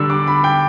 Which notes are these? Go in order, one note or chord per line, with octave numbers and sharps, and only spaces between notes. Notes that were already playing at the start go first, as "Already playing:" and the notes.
Already playing: D3 G3 D4 E6
D6
B5
G5